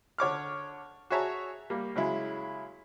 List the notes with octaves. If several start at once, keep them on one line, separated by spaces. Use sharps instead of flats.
D3 C#5 D6 F6
F#4 G#4 C#5 E5 A5 A#5
G3 A#3
C#3 F#3 G#3 E4